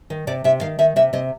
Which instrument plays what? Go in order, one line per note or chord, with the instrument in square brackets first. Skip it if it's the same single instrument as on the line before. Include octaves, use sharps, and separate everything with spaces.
[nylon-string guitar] D#3
C3 D5
C3 E5
D#3 F5
D#3 E5
C3 E5
C3 D#5